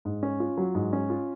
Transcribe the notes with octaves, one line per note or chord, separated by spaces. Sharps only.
G#2
C#4
F4
F#3
G#2
C#4
F4